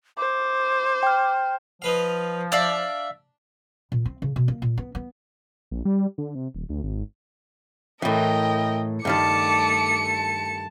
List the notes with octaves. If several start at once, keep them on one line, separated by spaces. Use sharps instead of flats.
C5 D6
G5 F6
F3 D#4 B4 F5
D4 D5 E5 F5
A#2
C4
C#3
B2
A#3
A#2
B3
B3
A#1
G3
D3
C3
D#1
D2
G#1
A2 E3 A#4 D#5 G5
G2 D#3 G3 A3 A5 D6 C#7
A5